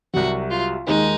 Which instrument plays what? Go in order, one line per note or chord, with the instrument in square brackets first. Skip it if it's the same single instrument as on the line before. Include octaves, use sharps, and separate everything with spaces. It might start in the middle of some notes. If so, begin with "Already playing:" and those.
[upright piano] C2 C3 F#3 [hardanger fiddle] F#4
[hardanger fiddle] F4
[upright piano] D#2 D#3 G#3 [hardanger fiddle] D#4